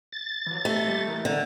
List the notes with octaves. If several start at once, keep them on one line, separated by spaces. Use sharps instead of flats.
A6
E3 F#3
A3 G4 E5
G3 A#3 G4
E3 A#4
D3